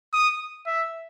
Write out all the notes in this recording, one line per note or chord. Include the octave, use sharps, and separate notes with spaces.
D#6
E5